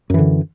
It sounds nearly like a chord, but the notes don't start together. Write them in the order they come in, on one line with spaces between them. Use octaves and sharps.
F#2 E3 D3